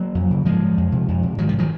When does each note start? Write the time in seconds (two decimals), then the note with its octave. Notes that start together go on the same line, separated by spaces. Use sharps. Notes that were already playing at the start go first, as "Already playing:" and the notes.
Already playing: F#3 A#3
0.15 F2
0.31 C#3
0.45 G#2 F3 G#3
0.77 F2
0.92 C3
1.08 F2
1.23 C3
1.38 G#2 D#3 F#3
1.49 F3
1.59 D#3 F#3